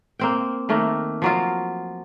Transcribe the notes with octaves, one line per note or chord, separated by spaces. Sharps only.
A#3 C4 G5
D#3 A3 A#3
F3 F#3 F4